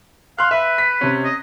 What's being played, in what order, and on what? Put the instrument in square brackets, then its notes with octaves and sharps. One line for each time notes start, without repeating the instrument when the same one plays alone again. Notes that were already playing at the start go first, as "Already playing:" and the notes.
[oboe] F5 [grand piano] C6 F#6
[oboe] B4 [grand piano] E5
[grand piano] B6
C3 C#4
[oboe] D#5